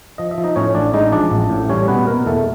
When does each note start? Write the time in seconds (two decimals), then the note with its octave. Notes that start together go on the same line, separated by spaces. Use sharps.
0.18 F3 D#5
0.31 E5
0.38 F3
0.44 D#4 D#5
0.56 A2 C#4 C#5
0.75 A1 D4 D5
0.93 G#3 D#4 D#5
1.12 F3 D4 D5
1.31 A1
1.50 A2
1.69 G3 C#4 C#5
1.88 B2 B3 B4
2.07 B2 A#3 A#4
2.26 E2 A3 A4